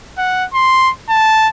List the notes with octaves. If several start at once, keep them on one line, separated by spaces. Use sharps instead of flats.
F#5
C6
A5